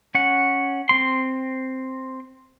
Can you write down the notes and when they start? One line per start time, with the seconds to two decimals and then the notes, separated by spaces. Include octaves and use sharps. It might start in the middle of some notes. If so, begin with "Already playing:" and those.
0.15 C#4 F#5
0.89 C4 C6